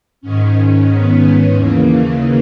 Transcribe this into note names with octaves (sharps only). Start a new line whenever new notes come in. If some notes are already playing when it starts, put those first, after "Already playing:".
G#2 D#3 C#4
C#4
B3
B3
D#2 C#3 E3 A#3